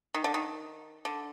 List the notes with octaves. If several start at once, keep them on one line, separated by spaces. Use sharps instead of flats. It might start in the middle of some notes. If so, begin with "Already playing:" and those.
D#3
D3
D#3
D3